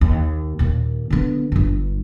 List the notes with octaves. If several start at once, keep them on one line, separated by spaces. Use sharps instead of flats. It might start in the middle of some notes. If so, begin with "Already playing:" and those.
D#2
D#2 A#2
D3 B3
G1 G2